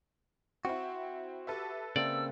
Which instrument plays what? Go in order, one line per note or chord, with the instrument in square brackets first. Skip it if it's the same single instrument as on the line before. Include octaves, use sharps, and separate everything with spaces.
[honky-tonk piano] C4 E4 [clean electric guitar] F#4
[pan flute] G4 [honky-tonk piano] A4 B4 E5
[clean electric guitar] C#3 A#3 C4 [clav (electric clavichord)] D5 [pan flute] E6